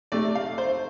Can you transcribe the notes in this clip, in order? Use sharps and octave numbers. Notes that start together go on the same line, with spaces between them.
C3 A3 D5
F5
C5